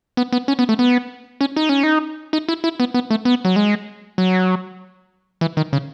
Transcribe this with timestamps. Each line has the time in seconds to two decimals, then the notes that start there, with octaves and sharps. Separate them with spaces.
0.17 B3
0.33 B3
0.48 C#4
0.59 B3
0.69 A3
0.79 B3
1.41 C#4
1.56 D#4
1.69 C#4
1.83 D#4
2.33 D#4
2.49 E4
2.64 E4
2.80 B3
2.94 B3
3.10 A3
3.25 B3
3.45 F#3
3.56 G#3
4.18 F#3
5.41 E3
5.57 D#3
5.73 C#3